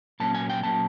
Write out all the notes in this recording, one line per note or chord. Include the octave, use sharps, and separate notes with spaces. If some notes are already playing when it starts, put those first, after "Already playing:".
A#2 F#3 A#3 C#4 A5
G#5
G5
A#2 F#3 A#3 C#4 A5